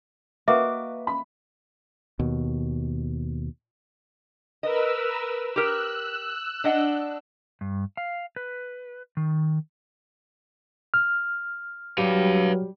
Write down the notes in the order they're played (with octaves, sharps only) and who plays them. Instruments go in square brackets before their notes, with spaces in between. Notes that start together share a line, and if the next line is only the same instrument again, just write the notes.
[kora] A#3 F#4 D#5 [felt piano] B4 [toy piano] E5 [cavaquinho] D6
[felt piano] B5
[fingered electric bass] D#2 B2
[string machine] A#4 B4 E6 [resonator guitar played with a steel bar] D#5
[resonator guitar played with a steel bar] G4 A#4 [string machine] E6 F#6
[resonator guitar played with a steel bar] D4 D#5 F#5
[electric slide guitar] G2
F5
B4
D#3
[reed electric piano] F6
[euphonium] F#3 [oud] G3 G4 [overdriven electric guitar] B4 F5